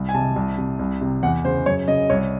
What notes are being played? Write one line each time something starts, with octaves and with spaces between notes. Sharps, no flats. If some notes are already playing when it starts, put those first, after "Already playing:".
Already playing: C2
G#5
C3 A5
C2
C3
C2
C3
E2 F#5
C#3 C5
F#2 C#5
C#3 D#5
C2 C#5